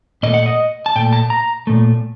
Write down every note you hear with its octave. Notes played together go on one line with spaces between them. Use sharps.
A#2 A3 D#5
F#5
D#5
A5
A#2 A3 G5
A5
A#5
A#2 A3